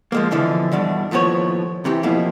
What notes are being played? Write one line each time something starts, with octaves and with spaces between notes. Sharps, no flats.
F3 G#3 A#3
B2 D3 E3 F3
E2 G2 B2 D4
D#2 A2 F3 B3 C#5
C3 E3 G4
F2 B2 F3 A#3 E4